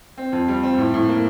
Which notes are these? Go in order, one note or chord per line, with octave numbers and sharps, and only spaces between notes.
C4
F2
G3
C4
A2
A2
A#3